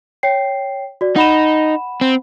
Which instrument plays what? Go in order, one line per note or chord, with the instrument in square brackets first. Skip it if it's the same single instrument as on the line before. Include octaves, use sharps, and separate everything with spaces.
[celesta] C#5 G5 C7
F#4 D5
[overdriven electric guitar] D#4 [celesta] F#5 B5 E7
[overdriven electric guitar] C4